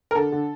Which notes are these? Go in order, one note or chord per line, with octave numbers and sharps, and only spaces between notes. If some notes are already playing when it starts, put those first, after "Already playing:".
A#4
D3 A4
D3